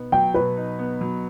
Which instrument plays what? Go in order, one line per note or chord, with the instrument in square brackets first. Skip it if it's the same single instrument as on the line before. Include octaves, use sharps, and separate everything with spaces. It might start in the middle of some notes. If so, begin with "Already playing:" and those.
Already playing: [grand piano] B2 B3 D#4
[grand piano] F#3 [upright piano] G5
[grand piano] B2 [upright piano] B4
[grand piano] D#4
B3
F#3